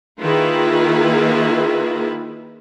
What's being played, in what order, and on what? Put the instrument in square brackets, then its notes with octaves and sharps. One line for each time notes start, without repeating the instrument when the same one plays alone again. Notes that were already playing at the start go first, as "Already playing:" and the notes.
[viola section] D#3 A#3 E4 F4 G#4 B4